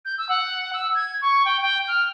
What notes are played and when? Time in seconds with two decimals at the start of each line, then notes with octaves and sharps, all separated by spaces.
0.05 G6
0.18 E6
0.29 F#5
0.73 E6
0.95 G#6
1.22 C#6
1.45 G5
1.62 G5
1.88 F6